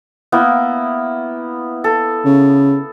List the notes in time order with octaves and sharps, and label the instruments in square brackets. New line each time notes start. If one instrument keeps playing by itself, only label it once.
[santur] A#3 B3 E4
A4
[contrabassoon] C#3